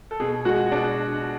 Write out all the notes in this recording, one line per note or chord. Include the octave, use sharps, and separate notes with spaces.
A4
B2 G#4
G#3 F#4
B2 D4